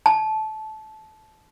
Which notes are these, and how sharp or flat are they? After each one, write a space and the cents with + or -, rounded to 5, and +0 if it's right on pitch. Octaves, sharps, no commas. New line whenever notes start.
A5 -20